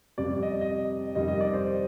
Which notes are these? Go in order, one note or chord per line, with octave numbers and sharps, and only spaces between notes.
F2 C3 G3 D5
D#5
D#5
F2 C3 D#3 G3 D#5
D#5
D5
C5